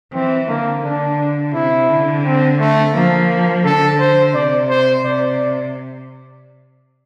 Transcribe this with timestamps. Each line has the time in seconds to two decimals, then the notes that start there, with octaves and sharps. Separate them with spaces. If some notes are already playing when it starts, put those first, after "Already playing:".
0.13 E3 C4
0.48 D3 A#3
0.83 D3 D4
1.54 C3 E4
1.89 D3
2.24 C4
2.59 A3
2.93 F3 A#3
3.64 D3 A4
3.99 C5
4.34 C3 D5
4.69 C5
5.04 C3 D5